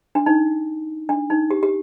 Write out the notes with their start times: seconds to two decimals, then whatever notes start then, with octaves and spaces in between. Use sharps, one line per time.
0.15 D4
0.26 D#4
1.09 D4
1.30 D#4
1.51 G4
1.63 G4